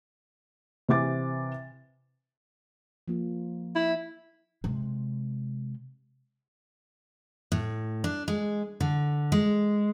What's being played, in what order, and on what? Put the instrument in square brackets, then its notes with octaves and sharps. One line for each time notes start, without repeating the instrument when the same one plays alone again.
[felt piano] C3 E3 D6 A6
[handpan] F3 A#3 F4
[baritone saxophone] E4
[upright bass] C3 G#3
[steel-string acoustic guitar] A2
D4
G#3
D3
G#3